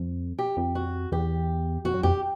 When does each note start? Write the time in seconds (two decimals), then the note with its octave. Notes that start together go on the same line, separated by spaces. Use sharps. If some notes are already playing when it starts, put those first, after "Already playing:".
Already playing: F2
0.39 G4
0.57 F2
0.75 F#4
1.12 E2 G4
1.85 F2 F#4
1.94 F#2
2.03 F2 G4